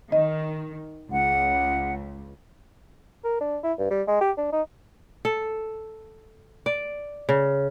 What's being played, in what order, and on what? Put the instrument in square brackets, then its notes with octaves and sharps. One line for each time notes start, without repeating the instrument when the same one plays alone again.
[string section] D#3 [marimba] D#5
[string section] C#2 [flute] F#5
[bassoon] A#4
D4
E4
G2
G3
G#3
G4
D4
D#4
[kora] A4
D5
C#3